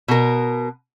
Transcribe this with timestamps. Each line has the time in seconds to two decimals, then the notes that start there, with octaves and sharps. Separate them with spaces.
0.08 B2 A#4